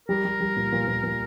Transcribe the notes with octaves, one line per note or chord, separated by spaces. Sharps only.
G3 A#4
G3
G3
A#2
A#2
A#2
A#2